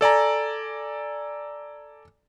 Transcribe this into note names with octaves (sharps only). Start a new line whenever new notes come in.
A4 D5 G#5 A#5